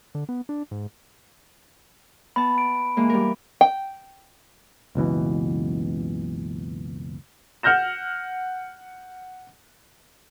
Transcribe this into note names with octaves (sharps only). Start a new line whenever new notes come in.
D3
B3
D4
G#2
B3 A5 B5
D7
E3 G#3 A#3
G3 A#4
G5
F#1 C#2 B2 E3
F#5 F6 G6 A#6 E7